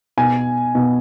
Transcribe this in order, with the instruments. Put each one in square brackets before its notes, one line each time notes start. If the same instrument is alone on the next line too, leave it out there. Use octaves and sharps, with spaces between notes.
[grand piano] B2 G#5
B2